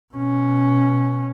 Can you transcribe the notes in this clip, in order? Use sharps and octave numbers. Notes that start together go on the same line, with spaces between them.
B2 C#4